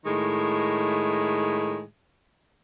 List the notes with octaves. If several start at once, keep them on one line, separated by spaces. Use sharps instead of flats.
A2 D#3 G#3